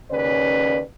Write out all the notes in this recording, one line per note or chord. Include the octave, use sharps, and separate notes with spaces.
D#2 C#3 C#4 B4 D5